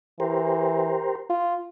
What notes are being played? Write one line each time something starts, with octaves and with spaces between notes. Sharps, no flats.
E3 G4 A#4 C5
F4